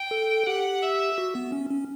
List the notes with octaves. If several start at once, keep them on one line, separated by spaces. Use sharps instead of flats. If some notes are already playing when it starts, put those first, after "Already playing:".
Already playing: G5
A4
G4 F#5
E5
F#4
B3
C#4
C#4